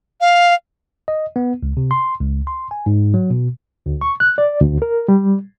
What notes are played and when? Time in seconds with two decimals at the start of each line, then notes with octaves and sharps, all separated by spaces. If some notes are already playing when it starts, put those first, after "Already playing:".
0.21 F5
1.08 D#5
1.36 B3
1.63 C#2
1.77 C3
1.91 C6
2.20 C#2
2.47 C6
2.71 G#5
2.86 G#2
3.14 F#3
3.30 B2
3.86 D2
4.01 C#6
4.20 F#6
4.38 D5
4.61 D2
4.82 A#4
5.08 G3